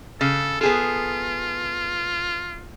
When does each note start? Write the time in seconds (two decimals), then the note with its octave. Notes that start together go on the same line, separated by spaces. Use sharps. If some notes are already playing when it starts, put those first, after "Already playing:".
0.21 C#3 A4
0.61 B3 F4 G#4 A4